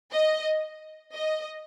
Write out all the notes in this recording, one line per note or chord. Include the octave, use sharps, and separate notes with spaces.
D#5
D#5